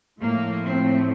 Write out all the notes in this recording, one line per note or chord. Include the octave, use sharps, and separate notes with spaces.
A2 F3 A3 A#3
C4